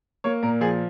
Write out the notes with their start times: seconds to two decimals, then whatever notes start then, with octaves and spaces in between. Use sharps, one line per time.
0.24 A#3 C#5
0.43 A#2 A#4
0.61 F3 G#4